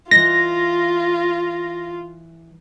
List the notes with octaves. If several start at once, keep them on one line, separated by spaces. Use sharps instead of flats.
E3 F4 D#5 A#6